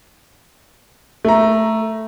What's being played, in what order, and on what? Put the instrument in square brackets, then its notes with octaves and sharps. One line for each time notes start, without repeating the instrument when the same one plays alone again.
[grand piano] A3 A#5